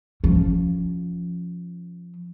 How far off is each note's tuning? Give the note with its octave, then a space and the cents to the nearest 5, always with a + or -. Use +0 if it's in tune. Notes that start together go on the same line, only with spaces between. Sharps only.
F3 +0 C#4 +0